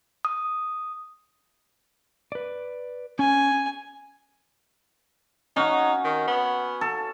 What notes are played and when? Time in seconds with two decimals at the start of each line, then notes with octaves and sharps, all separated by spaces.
0.25 D#6
2.32 B4 D5
3.19 C#4 G#5
5.56 C#4 D#4 F#4
6.04 D#3
6.28 B3
6.81 A4